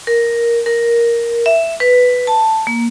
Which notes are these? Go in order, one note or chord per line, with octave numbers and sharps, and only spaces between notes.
A#4
A#4
E5
B4
A5
A#3